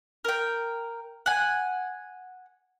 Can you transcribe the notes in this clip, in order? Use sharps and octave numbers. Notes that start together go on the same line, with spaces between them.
A#4 G5
F#5 G#5